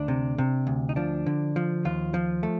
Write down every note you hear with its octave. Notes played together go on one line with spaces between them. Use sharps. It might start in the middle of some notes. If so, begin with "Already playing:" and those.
Already playing: D2 D4
C3
C3
D2
D#4
F3 D4
D3
F3
D#2 F4
F3
A3